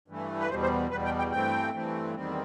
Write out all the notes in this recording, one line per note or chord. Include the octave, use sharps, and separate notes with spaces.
G2 E3 A3
B4
E2 B2 G3 C5
C5
E2 B2 G3 B4
G5
G5
G2 E3 A3 C4 G5
G2 E3 A3 C4
E2 D#3 G3 C4